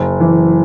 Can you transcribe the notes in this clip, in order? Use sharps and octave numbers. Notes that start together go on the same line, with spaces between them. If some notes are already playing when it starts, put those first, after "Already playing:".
Already playing: F#1
E3